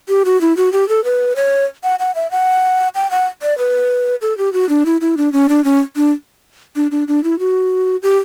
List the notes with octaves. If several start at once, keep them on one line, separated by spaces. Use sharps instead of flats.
G4
F#4
E4
F#4
G4
A4
B4
C#5
F#5
F#5
E5
F#5
G5
F#5
D5
B4
A4
G4
F#4
D4
E4
E4
D4
C#4
D4
C#4
D4
D4
D4
D4
E4
F#4
G4